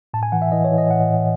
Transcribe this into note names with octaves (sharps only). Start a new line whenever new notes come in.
A2 A5
G#5
E3 F#5
E5
E3 D#5
C#5
E3
D#5
A2 F#5
A2